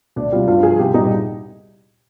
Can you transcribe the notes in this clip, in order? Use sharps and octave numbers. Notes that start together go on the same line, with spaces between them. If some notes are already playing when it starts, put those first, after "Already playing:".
D2 D4
C3 G3 F4
G2 F4
F3 G#4
C2 G4
A#2 G3 D#4